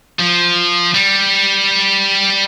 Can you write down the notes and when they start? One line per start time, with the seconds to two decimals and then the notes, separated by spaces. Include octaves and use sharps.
0.20 F3
0.94 G3